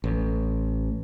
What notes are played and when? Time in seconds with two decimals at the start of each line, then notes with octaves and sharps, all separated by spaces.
0.04 A1